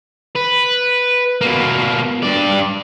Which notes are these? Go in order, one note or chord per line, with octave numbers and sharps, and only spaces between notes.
B4
B2 A#3
G2 D5